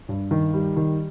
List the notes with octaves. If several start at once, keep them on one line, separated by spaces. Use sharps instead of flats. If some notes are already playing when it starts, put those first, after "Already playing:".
G2
D#3
G3
D#3